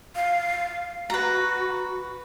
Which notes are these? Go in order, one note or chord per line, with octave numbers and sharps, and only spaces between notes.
F5
F#4 B4 A#5